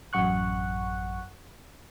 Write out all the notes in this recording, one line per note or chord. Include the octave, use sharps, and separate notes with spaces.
A1 F#2 F#5 C#6 F#6